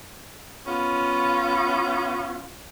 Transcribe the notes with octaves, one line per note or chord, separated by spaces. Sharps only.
B3 C#4 F4